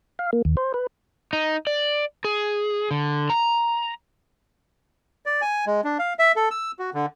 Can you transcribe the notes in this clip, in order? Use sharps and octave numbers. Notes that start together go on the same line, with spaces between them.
F5
A#3
D#2
C5
B4
D#4
D5
G#4
D3
A#5
D5
G#5
G#3
D4
F5
E5
A4
E6
F#4
D3